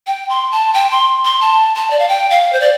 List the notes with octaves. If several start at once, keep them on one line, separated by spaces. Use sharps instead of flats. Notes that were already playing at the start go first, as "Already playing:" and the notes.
G5
C6
A5
G5
C6
C6
A5
A5
D5
F5
G5
F5
C5
D5